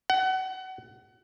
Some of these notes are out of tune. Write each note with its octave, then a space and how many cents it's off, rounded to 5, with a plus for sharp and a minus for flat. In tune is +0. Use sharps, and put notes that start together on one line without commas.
F#5 +30